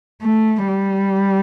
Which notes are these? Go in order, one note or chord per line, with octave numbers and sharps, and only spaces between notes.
A3
G3